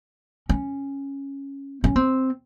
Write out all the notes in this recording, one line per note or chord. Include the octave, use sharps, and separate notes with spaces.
C#4
C#4
C4